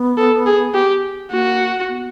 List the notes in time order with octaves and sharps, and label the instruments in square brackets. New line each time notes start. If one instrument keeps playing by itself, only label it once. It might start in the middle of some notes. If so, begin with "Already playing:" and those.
Already playing: [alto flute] B3
[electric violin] A4
G#4
G4
[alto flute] A#3 [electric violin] F#4
[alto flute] B3